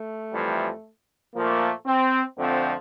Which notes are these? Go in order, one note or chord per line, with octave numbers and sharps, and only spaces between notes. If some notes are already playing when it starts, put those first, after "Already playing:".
Already playing: A3
F2 E3 G3
A#2 F3 A3 A#3
C4
F2 D3 F3 A3 C4